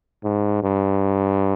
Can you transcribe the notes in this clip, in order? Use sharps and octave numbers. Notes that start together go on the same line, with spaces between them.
G#2
G2